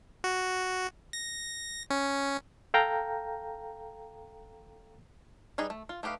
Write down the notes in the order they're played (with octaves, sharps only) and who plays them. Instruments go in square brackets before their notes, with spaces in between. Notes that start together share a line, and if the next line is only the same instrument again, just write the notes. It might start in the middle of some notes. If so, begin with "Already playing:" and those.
[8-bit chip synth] F#4
A#6
C#4
[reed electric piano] A4 F5 G5 A#5
[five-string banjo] G3 D#4 G#4 B4 D#5
A3
F4
A3 D#4 G4 B4 F5